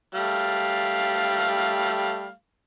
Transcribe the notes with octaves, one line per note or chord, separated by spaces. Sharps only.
G3 A3 F5